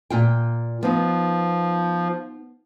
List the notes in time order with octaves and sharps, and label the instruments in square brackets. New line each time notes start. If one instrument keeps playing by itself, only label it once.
[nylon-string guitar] A#2 F4 G5
[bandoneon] F3 [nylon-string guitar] B3 D#4